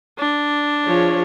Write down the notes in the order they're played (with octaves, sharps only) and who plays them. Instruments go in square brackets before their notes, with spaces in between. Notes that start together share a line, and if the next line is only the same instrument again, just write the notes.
[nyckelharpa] D4
[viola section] F3 G#4 C#5